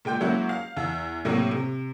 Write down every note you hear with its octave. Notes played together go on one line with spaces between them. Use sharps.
A#2 G#3 G5 G6
F#3 G#3 A#3 C#4 E4 F#4
F5
E2 E6
A2 C3 F#3 A#3
C3